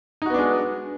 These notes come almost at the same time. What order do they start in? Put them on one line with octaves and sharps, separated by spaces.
D#4 F#4 B3 D4 G#3